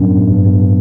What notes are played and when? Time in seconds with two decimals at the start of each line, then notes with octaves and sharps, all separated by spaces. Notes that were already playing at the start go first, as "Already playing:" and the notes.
Already playing: F#2 A2 F#3 B3 D4
0.17 A2
0.31 G2
0.44 B3